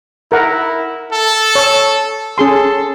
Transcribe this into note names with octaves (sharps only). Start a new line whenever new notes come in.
E4 A#4 F#5 A#5
A4
C#5 E6
C#4 G#4 A4 C6